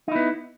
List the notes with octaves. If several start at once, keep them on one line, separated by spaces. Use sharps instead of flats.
B3 D#4 E4